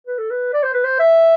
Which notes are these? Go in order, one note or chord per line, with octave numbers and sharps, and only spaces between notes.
B4
A4
B4
D5
C5
B4
C5
E5